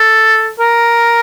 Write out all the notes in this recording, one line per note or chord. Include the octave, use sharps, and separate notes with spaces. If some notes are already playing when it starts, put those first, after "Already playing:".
Already playing: A4
A#4